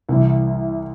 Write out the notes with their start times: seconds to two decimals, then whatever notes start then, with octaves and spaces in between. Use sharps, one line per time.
0.09 C2 C3 E3